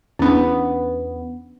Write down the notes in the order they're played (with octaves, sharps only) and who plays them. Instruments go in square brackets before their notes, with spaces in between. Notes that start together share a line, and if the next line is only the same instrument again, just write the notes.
[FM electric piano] E2 B3 [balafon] C#4 D4